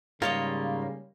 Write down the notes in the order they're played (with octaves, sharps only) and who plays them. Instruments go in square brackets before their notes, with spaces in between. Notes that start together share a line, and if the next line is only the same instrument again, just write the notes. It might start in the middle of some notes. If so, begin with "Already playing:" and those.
[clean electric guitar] G#2 A#3 [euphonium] C#3 [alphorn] G3 [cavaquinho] F4 C#5 D#5